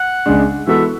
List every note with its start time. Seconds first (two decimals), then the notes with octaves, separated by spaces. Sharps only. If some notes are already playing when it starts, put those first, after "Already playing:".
Already playing: F#5
0.26 C#2 C#3 G#3 D4
0.67 E3 G#3 B3 F#4 A4 E5